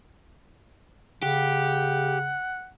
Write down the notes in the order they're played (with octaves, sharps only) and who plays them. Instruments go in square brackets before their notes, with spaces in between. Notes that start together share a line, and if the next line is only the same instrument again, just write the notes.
[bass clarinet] C#3 [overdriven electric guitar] G4 [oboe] F#5